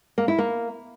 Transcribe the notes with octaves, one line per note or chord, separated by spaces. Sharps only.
A#3
E4
A#3